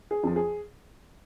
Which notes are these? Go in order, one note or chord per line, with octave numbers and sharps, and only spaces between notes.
G#4
F2 F3
G#4